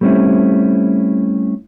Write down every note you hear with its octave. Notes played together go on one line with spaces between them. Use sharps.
G3 A3 C4 C#4 E4